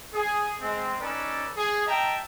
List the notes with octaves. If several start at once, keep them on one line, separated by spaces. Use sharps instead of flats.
G#4
G#3 C4
C#4 D#4 A4 B4 D5
G#4
D#5 E5 G5 A5 A#5